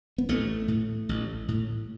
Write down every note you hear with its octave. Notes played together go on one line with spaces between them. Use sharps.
B3
A1 A3
A2
A1
A2